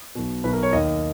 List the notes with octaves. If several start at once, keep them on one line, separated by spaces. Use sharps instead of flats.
B1 B2
B1 B2 B4
A#4
C#5
D#2 D#3 D#5